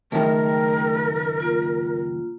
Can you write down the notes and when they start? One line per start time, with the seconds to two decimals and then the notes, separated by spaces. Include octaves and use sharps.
0.12 C#2 F#2 D#3 A3 G#4 A#4 G5
1.40 A#3 F4